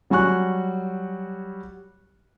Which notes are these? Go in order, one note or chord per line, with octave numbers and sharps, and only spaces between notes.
F#3 G3 F#4 G#5 C#6 F#6